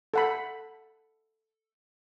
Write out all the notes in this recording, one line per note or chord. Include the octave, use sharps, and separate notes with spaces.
A4 F#5 B5